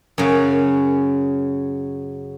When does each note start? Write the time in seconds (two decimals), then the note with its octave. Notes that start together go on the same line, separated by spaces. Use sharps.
0.18 F#2 C#3